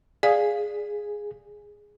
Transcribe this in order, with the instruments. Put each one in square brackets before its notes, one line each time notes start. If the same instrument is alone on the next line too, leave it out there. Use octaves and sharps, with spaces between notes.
[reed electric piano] G#4 [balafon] D5 F5